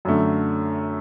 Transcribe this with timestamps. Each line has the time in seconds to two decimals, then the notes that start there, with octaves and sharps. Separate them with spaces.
0.05 F#2 D3 A3